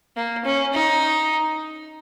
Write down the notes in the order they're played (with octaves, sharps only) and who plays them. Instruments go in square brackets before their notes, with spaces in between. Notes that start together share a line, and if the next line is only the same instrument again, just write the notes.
[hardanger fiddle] A#3
C#4
D#4